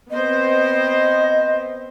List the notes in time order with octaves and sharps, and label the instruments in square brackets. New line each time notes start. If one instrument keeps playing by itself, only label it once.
[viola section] B3 C4 C5 [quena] D#5